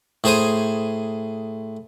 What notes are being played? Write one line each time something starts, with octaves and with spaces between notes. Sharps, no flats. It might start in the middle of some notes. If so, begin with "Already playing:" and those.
A2 G#4 C5 D#6